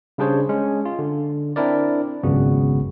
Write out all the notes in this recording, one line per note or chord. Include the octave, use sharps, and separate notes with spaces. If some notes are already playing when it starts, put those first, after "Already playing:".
C#3 G3 D4 G#4 C5 C#5
G#3 C#4
F4
D3
C4 D4 E4 A#4 D5
G#1 C#2 F#2 C#3 B3 F#4